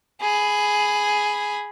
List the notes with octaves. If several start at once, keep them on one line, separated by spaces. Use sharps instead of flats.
G#4 B5